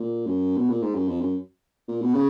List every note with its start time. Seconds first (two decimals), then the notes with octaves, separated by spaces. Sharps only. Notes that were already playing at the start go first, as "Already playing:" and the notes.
Already playing: A#2
0.27 F#2
0.57 B2
0.70 A#2
0.82 G#2
0.95 F#2
1.08 F2
1.21 F#2
1.88 A#2
2.02 B2
2.15 C#3